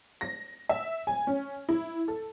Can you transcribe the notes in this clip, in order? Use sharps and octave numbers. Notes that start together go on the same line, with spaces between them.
A#6
E5
G#5
C#4
E4
A4